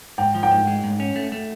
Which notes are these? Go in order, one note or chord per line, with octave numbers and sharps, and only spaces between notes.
G#2 G5
F3
G5
G#2
G#3
G#2
C#4
A3
A3